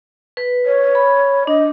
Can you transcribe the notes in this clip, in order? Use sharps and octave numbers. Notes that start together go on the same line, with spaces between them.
B4
C#5
B5
D4 D#5